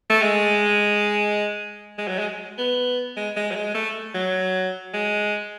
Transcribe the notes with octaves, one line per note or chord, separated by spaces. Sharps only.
A3
G#3
G#3
F#3
G#3
B3
G#3
G#3
F#3
G#3
A3
F#3
G#3